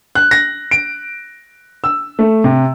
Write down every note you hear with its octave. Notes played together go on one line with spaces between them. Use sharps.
F#6
A#6
D7
E6
A3
C3